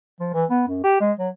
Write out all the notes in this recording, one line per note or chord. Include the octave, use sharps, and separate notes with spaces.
F3
E3
B3
F#2
G4
G#3
F#3